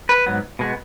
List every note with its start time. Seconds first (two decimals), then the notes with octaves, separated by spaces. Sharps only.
0.09 B4
0.26 G#2 F#3 B3
0.59 B2 G#3 B3